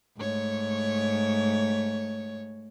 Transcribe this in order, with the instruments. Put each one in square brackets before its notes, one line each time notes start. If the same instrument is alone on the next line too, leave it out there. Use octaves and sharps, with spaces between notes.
[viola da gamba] G#2 A3 C#5